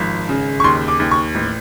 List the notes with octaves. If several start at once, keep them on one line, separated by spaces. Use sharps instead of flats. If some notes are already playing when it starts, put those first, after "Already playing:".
Already playing: G#1 F3
C#3
C#6
D#2 C6
D6
D#2
C#6
A1